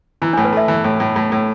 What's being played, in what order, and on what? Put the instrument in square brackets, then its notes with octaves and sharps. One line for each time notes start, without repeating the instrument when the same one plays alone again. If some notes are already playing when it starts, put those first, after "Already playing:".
[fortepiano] E3 [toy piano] E4
[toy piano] D4
[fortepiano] A2
[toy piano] B4
[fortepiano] A3 [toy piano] E5
[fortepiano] E3
A2
A2
A2
A2